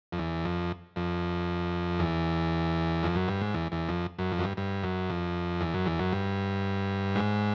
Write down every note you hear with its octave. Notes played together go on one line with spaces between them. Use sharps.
F2
E2
F2
F2
E2
F2
F#2
G2
G#2
E2
E2
F2
F#2
F2
F#2
G2
G2
F#2
F2
E2
F#2
E2
F#2
G2
G#2